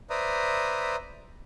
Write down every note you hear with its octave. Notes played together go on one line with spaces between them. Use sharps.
B4 C5 D5 E5 A#5 D#6